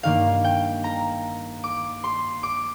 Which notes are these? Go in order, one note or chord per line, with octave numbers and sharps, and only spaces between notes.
G2 D#3 A#3 F5
G5
A#5
D6
C6
D6